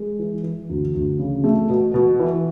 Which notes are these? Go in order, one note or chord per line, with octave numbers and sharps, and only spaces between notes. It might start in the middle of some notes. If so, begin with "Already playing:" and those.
Already playing: G#3
E3
E3
D2
D2
C#3
A3
B2
B2
E3